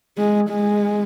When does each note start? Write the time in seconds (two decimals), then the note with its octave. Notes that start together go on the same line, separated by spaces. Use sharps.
0.17 G#3
0.50 G#3